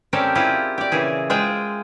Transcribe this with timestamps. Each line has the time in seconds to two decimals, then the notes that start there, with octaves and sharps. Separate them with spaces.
0.13 C4 C#4 G4 A4 A#4 D5
0.35 E4 F4 G4 G#4 C5
0.78 G4 D5
0.92 A#2 C#3 E3 E4 G#4
1.30 G#3 F4 G#4 C5 E5 G5